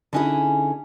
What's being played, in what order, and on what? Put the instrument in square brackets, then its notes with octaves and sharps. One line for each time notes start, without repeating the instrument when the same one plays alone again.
[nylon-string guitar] D3 B3 C#4 D#4 E4 G#4